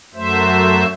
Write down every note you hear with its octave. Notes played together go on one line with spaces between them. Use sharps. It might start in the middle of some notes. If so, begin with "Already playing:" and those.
F#2 F#3 A3 C5 E5